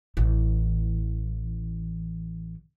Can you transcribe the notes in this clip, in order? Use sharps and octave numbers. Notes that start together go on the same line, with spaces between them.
A1 E3